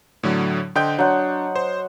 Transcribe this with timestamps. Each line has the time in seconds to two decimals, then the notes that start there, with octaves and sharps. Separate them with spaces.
0.23 A2 D3 F#3
0.75 D3 C5 D#5 G5 G6
0.98 F#3 D4 F#5 C6
1.56 C5